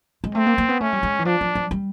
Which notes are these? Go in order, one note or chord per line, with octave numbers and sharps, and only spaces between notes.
G#3
A3 C4
A#3
A#3
B3
A3 C#4
G3
G#3
E3
F3 D4
F3
F3
G3